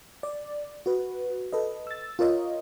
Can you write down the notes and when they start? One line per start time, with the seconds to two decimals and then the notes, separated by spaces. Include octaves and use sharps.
0.23 D5
0.86 F#4 B4
1.53 A4 B4 D#5
1.87 E6 A6
2.19 F4 A#4 C#5 D#5